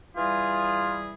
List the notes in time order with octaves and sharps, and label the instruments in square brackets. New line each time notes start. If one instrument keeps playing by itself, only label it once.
[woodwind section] E3 G3 G#4 [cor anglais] F4